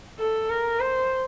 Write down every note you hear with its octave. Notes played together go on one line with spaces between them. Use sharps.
A4
A#4
C5